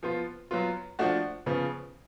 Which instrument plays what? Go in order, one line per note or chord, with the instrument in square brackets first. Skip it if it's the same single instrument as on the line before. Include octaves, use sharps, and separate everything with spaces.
[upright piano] F3 B3 F4
F#3 B3 F4
F3 A3 D4 F#4
C#3 F3 B3